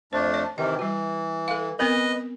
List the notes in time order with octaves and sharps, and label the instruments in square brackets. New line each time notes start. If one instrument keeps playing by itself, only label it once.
[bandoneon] F2 A3 D4 [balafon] C5
[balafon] C#5
[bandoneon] C3 D#3 E3 [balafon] D#5
[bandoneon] E3 [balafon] G3 F#4
[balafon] A4 F5
[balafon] B3 C4 A#4 [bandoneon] B4 D#5